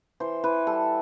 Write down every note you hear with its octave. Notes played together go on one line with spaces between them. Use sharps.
E3 C5
E3 B4
G3 A4